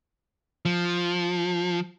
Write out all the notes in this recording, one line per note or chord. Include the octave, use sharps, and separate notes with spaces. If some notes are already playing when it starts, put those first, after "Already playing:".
F3